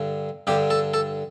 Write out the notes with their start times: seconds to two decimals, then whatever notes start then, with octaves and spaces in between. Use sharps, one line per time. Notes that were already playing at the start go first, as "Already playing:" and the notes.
Already playing: G2 D3
0.47 G2 D3 G4
0.70 A4
0.94 A4